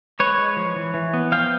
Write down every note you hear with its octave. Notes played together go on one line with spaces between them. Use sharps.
G#3 B4 C#5
G#3
F3
E3
E3
B3
F3 F5 G5